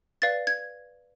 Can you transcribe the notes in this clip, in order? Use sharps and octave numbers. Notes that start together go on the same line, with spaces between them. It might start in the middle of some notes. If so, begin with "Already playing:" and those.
B4 D5 F5 A6
G#6